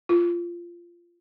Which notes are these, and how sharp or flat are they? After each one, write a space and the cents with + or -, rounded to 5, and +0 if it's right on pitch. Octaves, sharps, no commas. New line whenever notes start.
F4 -15